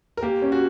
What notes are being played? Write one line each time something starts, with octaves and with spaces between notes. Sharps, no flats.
A#4
A#3 G4
C#4
F#4